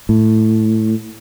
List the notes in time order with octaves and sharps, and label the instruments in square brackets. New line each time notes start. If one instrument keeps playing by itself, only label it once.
[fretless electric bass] A2